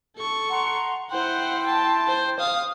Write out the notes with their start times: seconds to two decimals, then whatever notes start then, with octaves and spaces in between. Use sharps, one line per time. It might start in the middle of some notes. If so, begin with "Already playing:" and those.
0.16 A4 C#6
0.51 F#5 A#5 C6
1.11 E4 C5 F#5 G5 C6
1.66 A5
2.08 C5
2.39 F5 D#6